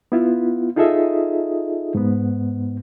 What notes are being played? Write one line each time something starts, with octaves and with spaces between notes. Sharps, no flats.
B3 E4 F4
D#4 F4 G#4 A4 D#5 E5
G#2 B3